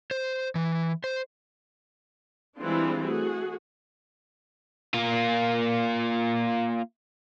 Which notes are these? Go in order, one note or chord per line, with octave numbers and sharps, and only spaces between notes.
C5
E3
C5
E3 G3 G#3 C4 D4 F4
A3 F#4 G#4
A#3 F4